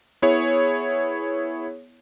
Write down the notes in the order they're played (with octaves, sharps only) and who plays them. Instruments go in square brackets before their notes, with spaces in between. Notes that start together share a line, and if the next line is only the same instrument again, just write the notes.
[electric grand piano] B3 E4 G#4 C#5